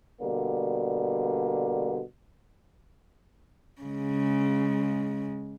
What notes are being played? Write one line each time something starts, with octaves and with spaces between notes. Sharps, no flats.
B2 D3 G3 A#3
C#3 G#3